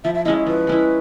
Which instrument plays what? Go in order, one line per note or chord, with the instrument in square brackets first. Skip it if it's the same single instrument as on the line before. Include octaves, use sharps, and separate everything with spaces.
[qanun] F3 [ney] E5
[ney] E5
[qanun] G#3 C#4 E4 [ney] D#5
[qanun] F3 [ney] B4
[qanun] G#3 C#4 E4